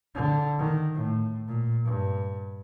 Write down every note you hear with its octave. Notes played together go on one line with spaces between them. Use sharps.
D3
D#3
A2
A#2
G2